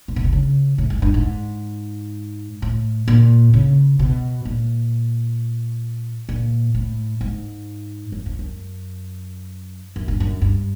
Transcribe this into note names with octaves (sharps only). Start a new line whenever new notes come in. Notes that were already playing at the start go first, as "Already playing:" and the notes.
A#2
B2
C3
C#3
A2
G#2
G2
G#2
A2
A#2
C#3
B2
A#2
A#2
A2
G#2
F#2
F2
F#2
F#2
G2
F#2
G2